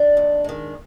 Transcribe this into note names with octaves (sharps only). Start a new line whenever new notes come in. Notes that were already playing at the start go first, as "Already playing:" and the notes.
Already playing: D4
D#2
D#3 G#3